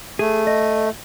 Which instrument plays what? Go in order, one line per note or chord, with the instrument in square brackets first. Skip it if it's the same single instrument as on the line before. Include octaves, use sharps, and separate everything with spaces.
[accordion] A3 [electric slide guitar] G#4
[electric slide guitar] D#5